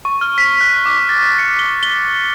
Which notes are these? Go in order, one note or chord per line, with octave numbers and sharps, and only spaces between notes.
C#6
F6
B6
F#6
D6
A6
C#7
G7
G7